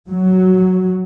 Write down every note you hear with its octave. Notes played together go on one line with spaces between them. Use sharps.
F#3